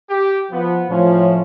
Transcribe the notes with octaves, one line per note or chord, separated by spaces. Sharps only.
G4
F3 B3
A2 F3 C#4